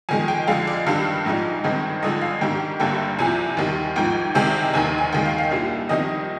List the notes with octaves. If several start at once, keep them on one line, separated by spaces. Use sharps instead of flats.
F2 D#3 G#3 G#5
G5
F2 D3 G#3 F5
D5
G2 D#3 G3 D4 F5
A#1 G#2 F3 G#3 D#4
G#1 G2 D#3 G#3 C4
G#1 G2 D3 F3 G#3 D#5
F5
G#2 D#3 G3 D4 G5
G1 G2 D3 G3 A#3 G5
C2 C3 F3 G#5
D#2 D#3 G3
G#1 G#2 F3 G5
C2 C3 D#3 G#3 G5
F1 D#2 D#3 G#5
G#5
D#2 D#3 G#3 G5
F5
F5
C2 A#2 G3 A#3 D4
F2 D#3 G3 C4 D#4 D#5